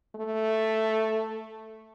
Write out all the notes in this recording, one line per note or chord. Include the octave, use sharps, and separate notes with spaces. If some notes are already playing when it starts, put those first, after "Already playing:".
A3